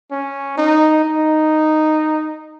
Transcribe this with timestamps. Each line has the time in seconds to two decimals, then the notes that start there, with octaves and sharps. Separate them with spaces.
0.11 C#4
0.58 D#4
1.05 D#4